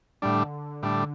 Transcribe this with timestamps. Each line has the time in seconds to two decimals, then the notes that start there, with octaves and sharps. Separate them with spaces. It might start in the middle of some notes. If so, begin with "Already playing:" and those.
0.22 A2 D3 G3 D4
0.83 A2 G3 D4